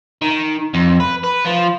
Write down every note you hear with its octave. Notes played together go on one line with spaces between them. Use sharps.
D#3
F2
B4
B4
F3